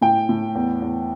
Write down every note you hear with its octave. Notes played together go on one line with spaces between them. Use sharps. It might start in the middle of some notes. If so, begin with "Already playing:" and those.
A2 G5
A2
E2
E2